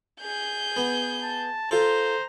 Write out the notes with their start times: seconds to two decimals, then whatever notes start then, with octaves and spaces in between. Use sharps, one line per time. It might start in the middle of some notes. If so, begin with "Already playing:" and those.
0.21 G#4 G6
0.77 B3
1.23 A5
1.71 F4 A4 C5 A#5